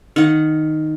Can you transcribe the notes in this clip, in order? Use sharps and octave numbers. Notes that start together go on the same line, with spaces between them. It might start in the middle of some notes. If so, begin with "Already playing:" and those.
D#3 F#5